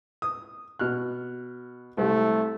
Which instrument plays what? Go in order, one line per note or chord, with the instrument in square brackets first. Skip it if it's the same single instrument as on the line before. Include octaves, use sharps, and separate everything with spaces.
[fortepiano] D#6
B2 F6 F#6
[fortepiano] C2 C3 [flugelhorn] A3